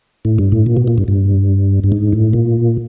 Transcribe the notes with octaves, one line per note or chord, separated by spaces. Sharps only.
A2
G2
A2
A#2
B2
A#2
G2
G2
G2
G#2
A2
A#2